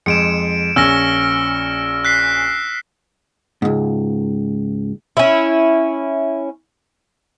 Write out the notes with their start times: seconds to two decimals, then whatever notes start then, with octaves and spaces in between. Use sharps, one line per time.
0.06 F2 G#3 C#7 D7 E7
0.76 A#1 C#4 E6 F6 A#6
2.05 F#6 B6 C7
3.62 C#2 G#2
5.17 C#4 E4